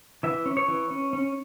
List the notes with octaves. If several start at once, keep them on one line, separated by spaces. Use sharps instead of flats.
E3 E5
C#4
C#5
E3
C#4
C#4